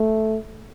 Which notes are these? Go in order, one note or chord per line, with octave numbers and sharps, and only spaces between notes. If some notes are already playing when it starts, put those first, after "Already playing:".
Already playing: A3